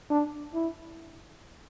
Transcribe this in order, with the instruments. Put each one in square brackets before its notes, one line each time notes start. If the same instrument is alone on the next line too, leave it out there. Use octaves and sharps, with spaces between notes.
[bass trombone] D4
E4